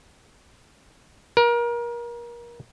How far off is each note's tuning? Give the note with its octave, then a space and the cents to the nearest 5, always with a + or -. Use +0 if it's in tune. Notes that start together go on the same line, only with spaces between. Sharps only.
A#4 +30